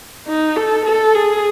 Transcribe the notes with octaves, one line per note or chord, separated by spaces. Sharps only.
D#4
A4
A4
G#4